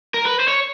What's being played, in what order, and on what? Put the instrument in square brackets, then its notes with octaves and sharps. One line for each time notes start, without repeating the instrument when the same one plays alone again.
[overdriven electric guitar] A#4
B4
C5
C#5